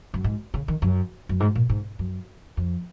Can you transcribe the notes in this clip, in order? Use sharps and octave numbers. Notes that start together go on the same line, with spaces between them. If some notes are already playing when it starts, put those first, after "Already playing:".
F#2
G#2
C#3
D#3
F#2
F#2
G#2
A#2
G#2
F#2
F2